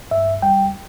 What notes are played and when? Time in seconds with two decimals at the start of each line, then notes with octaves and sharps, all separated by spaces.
0.11 G2 E5
0.42 G3 G5